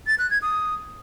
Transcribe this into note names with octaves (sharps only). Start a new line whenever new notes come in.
A6
F#6
G#6
D#6